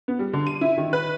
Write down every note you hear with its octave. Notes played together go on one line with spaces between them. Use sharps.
B3
G3
D3
D#7
E4
D#3
B4